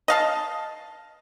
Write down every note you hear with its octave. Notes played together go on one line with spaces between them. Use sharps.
D#5 F5 A5